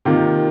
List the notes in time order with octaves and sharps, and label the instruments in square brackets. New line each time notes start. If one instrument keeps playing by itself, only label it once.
[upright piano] C3 D#3 A#3 F4